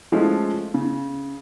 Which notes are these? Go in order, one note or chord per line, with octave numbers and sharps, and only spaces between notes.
F3 G#3 A3 C#4 F4
C#3